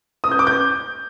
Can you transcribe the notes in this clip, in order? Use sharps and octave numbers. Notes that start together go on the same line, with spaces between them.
D#6
G6
D6
G6